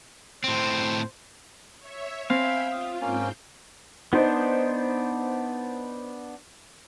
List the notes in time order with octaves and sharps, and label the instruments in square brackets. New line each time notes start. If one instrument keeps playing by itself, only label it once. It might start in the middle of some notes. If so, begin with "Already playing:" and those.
[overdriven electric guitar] A2 C4 [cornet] C5
[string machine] C#5 E5
[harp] C4 [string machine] E5 G5 [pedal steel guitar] F5 [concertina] G#5 B5
[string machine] F4 [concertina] D#6
[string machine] G#2 C4 G5 [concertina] A#3 C#4
[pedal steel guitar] B3 D4 [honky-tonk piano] D#4 C5